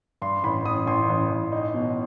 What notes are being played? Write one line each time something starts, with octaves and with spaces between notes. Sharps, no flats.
G2 C6
A1 B5
A1 D#6
A1 C6
A1
A1
D#4
B2